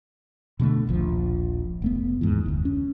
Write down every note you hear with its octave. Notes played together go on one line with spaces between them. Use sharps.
B2 D3 G3 A3
D#1 A#1 F3
F1 A3 B3
D#2 G#2 E3
F1 D2
C#4